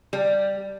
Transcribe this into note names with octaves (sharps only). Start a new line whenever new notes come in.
G3